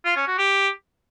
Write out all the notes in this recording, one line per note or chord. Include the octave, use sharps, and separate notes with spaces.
F4
C#4
F#4
G4